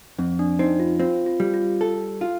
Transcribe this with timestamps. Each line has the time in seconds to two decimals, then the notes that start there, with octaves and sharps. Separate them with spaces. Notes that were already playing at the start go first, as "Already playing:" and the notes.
0.19 F2 C4
0.39 D4
0.59 C4 D#4
0.80 F4
0.99 C4 F4
1.26 F4
1.40 G3
1.54 F4
1.81 A4
2.21 F4